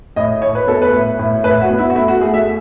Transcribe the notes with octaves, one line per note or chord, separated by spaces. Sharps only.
A2 D#5
A2 C#5
B4
B3 A4
B4
A2
A2
A2 B4
F#4
B3
E4
F#4
A3 E4
F#4
A3 G#4
E5